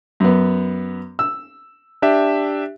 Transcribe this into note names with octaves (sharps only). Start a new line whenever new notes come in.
F#2 B3
E6
D4 G4 E5